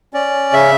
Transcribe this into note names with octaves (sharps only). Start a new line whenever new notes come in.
C#4 D5
C#3 E5